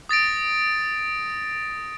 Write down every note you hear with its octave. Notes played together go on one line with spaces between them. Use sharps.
D#6 A6 A#6 D7